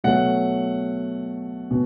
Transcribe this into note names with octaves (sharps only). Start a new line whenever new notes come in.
B2 F#3 A3 F#5
B2